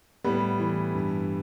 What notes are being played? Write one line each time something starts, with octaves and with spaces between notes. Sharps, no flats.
A2 G3 B3
E3
G2